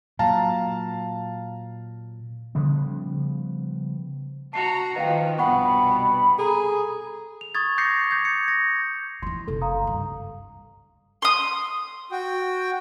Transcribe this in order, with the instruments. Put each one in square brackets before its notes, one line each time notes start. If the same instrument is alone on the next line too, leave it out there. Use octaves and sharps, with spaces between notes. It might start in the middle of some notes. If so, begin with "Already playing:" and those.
[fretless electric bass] A#2 F#3 [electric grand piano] F5 A5 A#5
[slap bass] C#3 F3 G3 B3
[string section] F#4 A#5 [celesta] A5 C7
[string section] D#3 F3 [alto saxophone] B4 [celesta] D#5 F5 G5
[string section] C2 G2 B2 [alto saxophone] B3 [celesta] F#5 G5 C#6 [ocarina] B5
[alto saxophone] G#4 [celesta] A4 A#5
[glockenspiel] F7
C#6 D#6 G#6 A6
D6 G6 A#6 C7 C#7
G6 G#6
C#7
A#6
[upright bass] D#3 E3 [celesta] C6
[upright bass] F#1 C3 [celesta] A4
[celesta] F5 A#5 D#6
[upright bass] G2 D#3
[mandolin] C6 D#6
[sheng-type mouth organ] F#4 G5